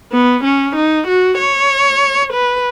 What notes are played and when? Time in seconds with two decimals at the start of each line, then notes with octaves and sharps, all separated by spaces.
0.12 B3
0.44 C#4
0.76 D#4
1.07 F#4
1.38 C#5
2.33 B4